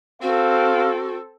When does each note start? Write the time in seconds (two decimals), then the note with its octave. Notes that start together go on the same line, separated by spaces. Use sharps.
0.22 C4 F#4 A4 F5